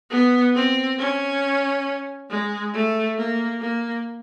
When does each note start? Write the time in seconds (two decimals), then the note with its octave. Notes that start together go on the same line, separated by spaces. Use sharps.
0.11 B3
0.55 C4
0.98 C#4
2.30 G#3
2.74 A3
3.18 A#3
3.61 A#3